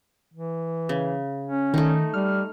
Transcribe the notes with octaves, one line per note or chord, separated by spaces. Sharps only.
E3
C#3
C#4
D#3 A3 D#4
G3 F6